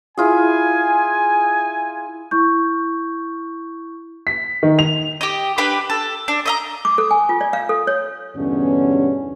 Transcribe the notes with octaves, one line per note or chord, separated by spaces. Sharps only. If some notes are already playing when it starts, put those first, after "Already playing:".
E4 F4 G#4 G#5
E4 C#6 G6
B6
D#3
F7
G4 D#5
D4 G4 B4 B5
A4
D4
D#5 E5 A#5
D6
A4
G#5
F4
D5
F5
A4
C#5
E2 G2 B2 D3 C#4